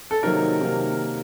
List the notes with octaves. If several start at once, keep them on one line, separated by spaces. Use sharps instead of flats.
A4
C3 D#3 F#3 A#3 A#4
C3 D#3 F#3 A#3